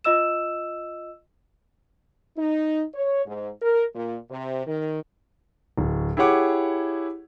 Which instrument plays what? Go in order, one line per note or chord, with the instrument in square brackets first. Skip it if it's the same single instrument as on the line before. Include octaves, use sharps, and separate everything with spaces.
[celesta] F4 D#5 E6 E7
[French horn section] D#4
C#5
G#2
A#4
A#2
C3
D#3
[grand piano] D1
E4 G4 G#4 C#5 F#5 D6